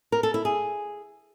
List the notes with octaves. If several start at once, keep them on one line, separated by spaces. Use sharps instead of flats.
A#4
A4
E4
G#4